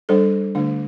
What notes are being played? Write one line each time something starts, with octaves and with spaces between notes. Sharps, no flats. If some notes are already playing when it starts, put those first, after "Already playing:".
G3 D4 A4 C5
D3 A3 D4